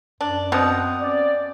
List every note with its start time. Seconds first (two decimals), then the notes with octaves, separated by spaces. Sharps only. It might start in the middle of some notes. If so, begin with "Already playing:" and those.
0.21 F#2 D4
0.52 B2 C4 C5 D#6
1.02 C#4 D5